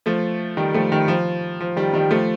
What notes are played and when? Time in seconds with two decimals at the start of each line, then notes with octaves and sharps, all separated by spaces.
0.06 F3 A3
0.57 D#3 G3
0.74 F3 A3
0.92 D#3 G3
1.08 F3
1.60 F3
1.76 D#3 G3
1.94 D#3 G3
2.11 F3 A3